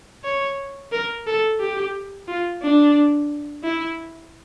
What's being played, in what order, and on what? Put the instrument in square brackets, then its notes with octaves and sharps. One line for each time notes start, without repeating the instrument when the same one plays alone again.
[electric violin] C#5
A#4
A4
G4
F4
D4
E4